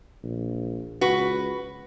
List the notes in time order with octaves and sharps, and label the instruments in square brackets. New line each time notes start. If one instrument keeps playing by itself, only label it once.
[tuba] A#1
[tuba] C#2 [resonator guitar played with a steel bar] F#4 B4